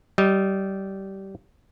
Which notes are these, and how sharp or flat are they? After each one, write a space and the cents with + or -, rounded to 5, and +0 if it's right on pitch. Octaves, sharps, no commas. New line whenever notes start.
G3 -20 D#5 +0